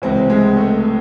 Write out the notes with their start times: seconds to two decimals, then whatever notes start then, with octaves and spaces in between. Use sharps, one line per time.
0.02 C#2 C3 E3 C4
0.30 G#3
0.57 A3